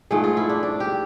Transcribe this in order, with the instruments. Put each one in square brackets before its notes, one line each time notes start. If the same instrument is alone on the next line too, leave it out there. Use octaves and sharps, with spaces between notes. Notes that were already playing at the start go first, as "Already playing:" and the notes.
[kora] G#2 F3 A3 G#4
F4
E4
D4
D4
G4